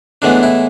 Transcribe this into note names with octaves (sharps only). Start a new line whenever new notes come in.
A2 E3 G#3 B3 D4
E4